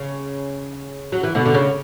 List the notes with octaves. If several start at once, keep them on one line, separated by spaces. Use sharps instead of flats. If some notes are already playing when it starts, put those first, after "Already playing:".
Already playing: C#3
F#3
E3
B2 D3
D3
C#3